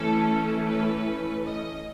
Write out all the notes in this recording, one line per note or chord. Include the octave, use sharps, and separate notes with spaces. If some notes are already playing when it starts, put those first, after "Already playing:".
Already playing: E3 A3 C#4 A4
B4
D#5